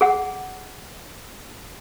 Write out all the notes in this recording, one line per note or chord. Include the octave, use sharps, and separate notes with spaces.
G#4 F#5